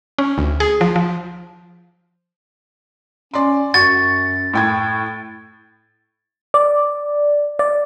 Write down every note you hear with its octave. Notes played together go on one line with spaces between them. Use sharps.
C#4
D2
G#4
F3
F3
C#4 D5 C6
F#2 F#4 C#6 A6 C#7
A2 G5 G#6
D5
D5